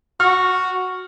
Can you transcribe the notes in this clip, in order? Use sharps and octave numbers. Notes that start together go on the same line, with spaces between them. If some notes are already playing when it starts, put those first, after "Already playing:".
F#4 F6